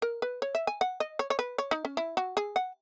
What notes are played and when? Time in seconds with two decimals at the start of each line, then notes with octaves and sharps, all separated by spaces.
0.02 A#4
0.22 B4
0.42 C#5
0.55 E5
0.67 G#5
0.81 F#5
1.00 D#5
1.19 C#5
1.30 C#5
1.39 B4
1.58 C#5
1.71 D#4
1.85 C#4
1.97 E4
2.17 F#4
2.37 G#4
2.56 F#5